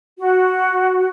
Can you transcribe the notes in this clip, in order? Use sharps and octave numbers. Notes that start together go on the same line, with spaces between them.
F#4